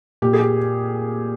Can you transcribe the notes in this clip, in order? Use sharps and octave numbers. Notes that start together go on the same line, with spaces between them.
A#2 G4
G#4
G4